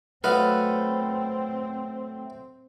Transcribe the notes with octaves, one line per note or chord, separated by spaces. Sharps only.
F#3 A3 C4 B4 D#5 F5